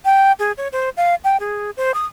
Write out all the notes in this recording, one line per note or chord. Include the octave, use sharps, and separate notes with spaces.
G5
G#4
C#5
C5
F5
G5
G#4
C5
D#6